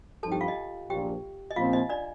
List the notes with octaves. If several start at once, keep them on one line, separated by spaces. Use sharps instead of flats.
G2 F3 C4 D#4 A4 A5
G4 G5
F4 F5
D#4 D#5
A#1 A#2 F3 G4 G5
D#5
A#1 A#2 F3 C4 F4 F5
D#4 D#5
D4 D5